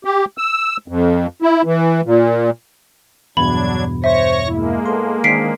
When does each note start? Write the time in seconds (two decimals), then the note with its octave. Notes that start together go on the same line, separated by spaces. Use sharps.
0.05 G4
0.38 E6
0.88 F2
1.42 E4
1.65 E3
2.05 A#2
3.37 E2 G2 B2 F#3 D4 B5 G#6
4.04 C5 C#5 E5 C#6 A#6
4.49 G#3 A#3 E4
4.86 A2 B3 A4 C6
5.24 D#3 E3 C4 D4 G#4 B6 C7 D7